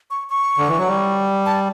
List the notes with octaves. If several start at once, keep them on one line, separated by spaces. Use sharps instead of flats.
C#6
C#6
D3
E3
F#3
G3
A5